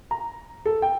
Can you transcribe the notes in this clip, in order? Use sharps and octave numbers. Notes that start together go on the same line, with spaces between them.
A#5
A4
G5